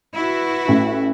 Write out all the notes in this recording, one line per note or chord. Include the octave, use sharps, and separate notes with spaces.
E4 F#4 B4
A1 A2